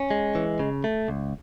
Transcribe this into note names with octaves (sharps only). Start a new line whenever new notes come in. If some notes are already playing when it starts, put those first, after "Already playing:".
Already playing: C#4
G#3
E3
C#3
A3
C#2